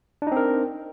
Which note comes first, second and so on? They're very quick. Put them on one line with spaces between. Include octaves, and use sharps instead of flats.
D4 D#4 C4 A#4